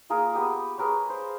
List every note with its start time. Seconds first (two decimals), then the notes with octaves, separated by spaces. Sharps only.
0.10 A#3 F4 G#4 A#4
0.33 B3 G4 D#6
0.78 G#4 A#4 B4 C#5
1.10 C5